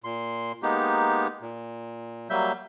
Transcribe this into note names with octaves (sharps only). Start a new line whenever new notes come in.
A#2 C6
G#3 A#3 B3 D#4 G4
A#2
F#3 G3 A#3 E5 G6